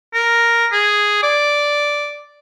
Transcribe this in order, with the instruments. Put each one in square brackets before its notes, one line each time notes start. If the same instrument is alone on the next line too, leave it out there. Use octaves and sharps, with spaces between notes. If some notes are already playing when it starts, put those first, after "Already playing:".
[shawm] A#4
G#4
D5